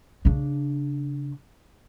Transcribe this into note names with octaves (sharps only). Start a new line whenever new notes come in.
C#3 D4